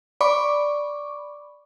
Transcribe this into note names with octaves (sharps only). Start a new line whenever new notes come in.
D5 B5 C#6 D6